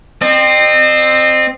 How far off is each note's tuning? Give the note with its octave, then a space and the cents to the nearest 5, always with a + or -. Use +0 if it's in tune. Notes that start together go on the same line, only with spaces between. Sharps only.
C4 +0 D#5 -40